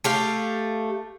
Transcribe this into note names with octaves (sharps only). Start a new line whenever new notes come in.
A3 G4 F5